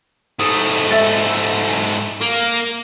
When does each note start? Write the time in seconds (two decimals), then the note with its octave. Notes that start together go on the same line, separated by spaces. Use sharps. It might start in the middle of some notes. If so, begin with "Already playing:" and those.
0.39 G#2 A3 D#6
0.91 A4 E5
2.21 A#3